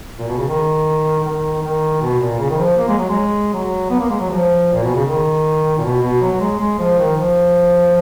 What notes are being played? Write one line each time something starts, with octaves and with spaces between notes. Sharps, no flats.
A#2
B2
C#3
D#3
D#3
D#3
B2
A#2
C#3
D#3
F3
A#3
G#3
F#3
G#3
F#3
B3
A#3
G#3
F#3
F3
A#2
B2
C#3
D#3
A#2
B2
B2
F#3
G#3
G#3
F3
D#3
F3